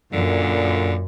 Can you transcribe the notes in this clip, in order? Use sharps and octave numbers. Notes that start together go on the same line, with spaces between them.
F#2 A#2 D3